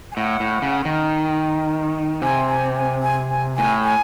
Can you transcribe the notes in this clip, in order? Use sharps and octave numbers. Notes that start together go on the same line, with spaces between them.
G#5
A2 F#5
A2
C#3
D#3
C3 G#5
G#5
G#5
G#5
G#5
A2 G#5
G#5